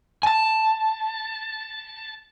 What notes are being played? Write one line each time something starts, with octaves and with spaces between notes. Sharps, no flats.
G#5 A5